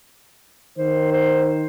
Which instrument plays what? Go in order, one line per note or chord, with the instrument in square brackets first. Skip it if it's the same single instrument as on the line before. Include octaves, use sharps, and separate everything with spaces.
[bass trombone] D#3 [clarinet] C5
[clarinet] C5